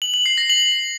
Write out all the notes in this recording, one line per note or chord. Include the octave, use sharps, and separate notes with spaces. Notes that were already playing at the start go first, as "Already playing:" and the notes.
F#7
F#7
C7
A#6
F#7